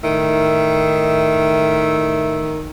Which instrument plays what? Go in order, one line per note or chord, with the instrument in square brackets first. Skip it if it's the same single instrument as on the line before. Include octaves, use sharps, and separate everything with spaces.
[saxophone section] A2 D#3 E5